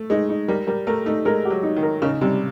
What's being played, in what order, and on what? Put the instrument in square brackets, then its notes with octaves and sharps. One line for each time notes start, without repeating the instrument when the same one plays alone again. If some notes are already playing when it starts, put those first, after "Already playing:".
Already playing: [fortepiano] A3
[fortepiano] G#3 [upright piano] D#4
[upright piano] D#4
[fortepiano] G3 [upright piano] A#4
[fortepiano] G3 [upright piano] A#4
[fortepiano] A3 [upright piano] A#4
[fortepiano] A3 [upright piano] D#4
[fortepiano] G#3 [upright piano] A#4
[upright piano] G4
[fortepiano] F#3
[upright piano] D#4
[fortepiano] D#3
[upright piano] A#4
[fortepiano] C#3 [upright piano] D#4
[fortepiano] C3 [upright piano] G3